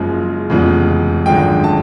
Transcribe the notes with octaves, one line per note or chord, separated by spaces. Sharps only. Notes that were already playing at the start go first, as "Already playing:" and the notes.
Already playing: F#1 F#2 C#3 F3 G#3
F1 E2 C#3 F3 G#3
G#1 F#2 D3 F3 G#3 G5
A5